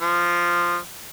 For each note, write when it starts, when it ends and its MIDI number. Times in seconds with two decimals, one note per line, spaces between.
0.01 0.76 53